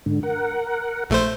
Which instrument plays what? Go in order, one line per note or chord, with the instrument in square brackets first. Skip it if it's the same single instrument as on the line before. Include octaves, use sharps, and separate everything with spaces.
[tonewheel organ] G#2 D3
A#4 F#5
[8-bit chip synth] A#1 A3 C5